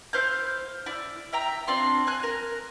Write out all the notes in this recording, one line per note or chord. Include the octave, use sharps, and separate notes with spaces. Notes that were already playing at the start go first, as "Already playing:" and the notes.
E4 C5 F5 G6
E4 D5
E5 G5 A#5
C4 D4 F4 C6
G#5 F#6
A#4